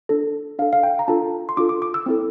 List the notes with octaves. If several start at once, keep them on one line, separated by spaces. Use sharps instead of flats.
D4 A4
D4 A4 F5
F5
G5
A#5
D4 F4 A4 A5
C6
D4 F4 A4 D6
D6
D6
E6
C4 E4 A4